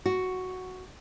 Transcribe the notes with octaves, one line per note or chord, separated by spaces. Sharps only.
F#4